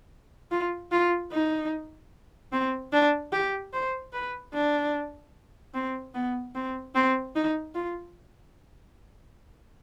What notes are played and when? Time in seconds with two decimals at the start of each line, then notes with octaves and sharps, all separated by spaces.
0.51 F4
0.91 F4
1.32 D#4
2.52 C4
2.93 D4
3.32 G4
3.73 C5
4.13 B4
4.53 D4
5.74 C4
6.14 B3
6.55 C4
6.95 C4
7.35 D#4
7.75 F4